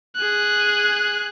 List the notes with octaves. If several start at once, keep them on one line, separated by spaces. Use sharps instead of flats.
G#4 F#6